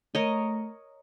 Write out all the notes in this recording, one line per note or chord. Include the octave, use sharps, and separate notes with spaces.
A3 A#4 C#5 D#5